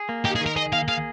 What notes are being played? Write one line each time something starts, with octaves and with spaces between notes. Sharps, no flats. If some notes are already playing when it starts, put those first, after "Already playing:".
Already playing: G#4
A#3
D#4 G4
G#4
D#3
A#4
G#4 D#5
A#3 F5
G#4 F5